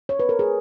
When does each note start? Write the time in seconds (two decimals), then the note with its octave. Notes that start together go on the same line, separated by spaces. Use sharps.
0.09 C#5
0.20 B4
0.29 A#4
0.39 G#4